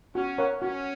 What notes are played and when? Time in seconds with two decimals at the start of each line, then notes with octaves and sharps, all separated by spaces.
0.15 C#4 F#4
0.38 A#4 C#5 F#5
0.61 C#4 F#4